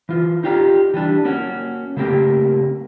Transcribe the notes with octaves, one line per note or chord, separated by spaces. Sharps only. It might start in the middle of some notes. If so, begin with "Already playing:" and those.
E3 F4
D#4 F4 G4 D5 F5 A#5
E3 G3 D4
A#3 C#4 F#4
C#3 A3 A#3 C4 G4 A#4